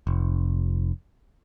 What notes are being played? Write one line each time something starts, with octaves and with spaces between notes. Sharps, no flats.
F1